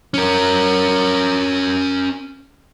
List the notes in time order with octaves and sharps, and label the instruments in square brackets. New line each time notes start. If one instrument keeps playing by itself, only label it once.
[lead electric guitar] C#4 A#4